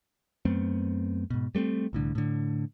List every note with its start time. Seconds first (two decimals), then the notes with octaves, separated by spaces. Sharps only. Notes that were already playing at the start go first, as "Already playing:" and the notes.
0.45 F#2 A3 B3 C4
1.30 G#2 B2
1.55 G3 A3 B3 C4
1.93 C2 A2 D3
2.15 A2 D3